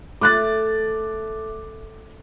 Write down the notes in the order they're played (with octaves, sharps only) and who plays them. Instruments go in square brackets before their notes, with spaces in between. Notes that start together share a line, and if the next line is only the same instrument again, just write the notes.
[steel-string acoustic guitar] A3 [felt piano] D6 F#6 A6